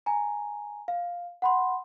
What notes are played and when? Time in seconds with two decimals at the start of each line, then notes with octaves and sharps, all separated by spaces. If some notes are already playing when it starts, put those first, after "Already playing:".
0.06 G#5 A#5
0.88 F5
1.42 F#5 B5 C6